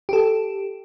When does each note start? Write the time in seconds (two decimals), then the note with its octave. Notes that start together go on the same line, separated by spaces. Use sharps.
0.09 G4 A4